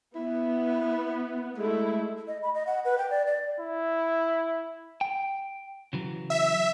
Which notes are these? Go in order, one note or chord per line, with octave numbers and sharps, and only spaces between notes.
B3 E4
G#3 A3 E4
D#5
B5
D#5
F#5
B4
G5
D5
D5
E4
G5
C#3 E3 F#3
E5